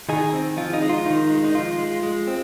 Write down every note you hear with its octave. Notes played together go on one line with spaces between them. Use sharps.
D#3 D#4 G#4
C4
F3 F4
D#4
G#3
F4
D#3 D#4
G#3
D#4
F3 F4
G#3
G#3
C4